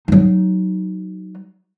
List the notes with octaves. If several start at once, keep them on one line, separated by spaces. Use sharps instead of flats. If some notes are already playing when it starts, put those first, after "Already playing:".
F#3 D#4